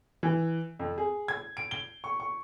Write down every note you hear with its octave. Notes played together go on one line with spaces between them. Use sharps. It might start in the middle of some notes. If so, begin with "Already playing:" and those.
E3
F2
G#4
G#6
D7
G7
C#6
C#6